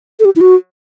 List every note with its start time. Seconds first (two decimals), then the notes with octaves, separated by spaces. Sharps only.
0.20 A4
0.25 G4
0.36 E4
0.41 F#4